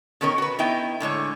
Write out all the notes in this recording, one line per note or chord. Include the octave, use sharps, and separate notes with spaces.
B2 D#3 C#4 A#4 C#5
F#4 B4
B3 D#4 E4 G5
A2 D3 G#3 C#5